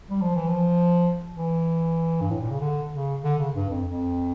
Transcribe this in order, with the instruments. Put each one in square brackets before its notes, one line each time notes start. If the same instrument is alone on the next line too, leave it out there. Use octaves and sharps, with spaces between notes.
[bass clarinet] G3
F3
E3
F3
E3
G2
A2
A#2
C#3
D3
C#3
D3
C#3
G2
F2
F2